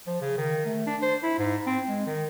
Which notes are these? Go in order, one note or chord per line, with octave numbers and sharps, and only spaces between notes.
F3
C#3
D#3
A3
D4
C5
E4
G#2
C4
G#3
D#3